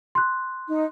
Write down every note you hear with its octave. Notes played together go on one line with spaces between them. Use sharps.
C6 F#6
D#4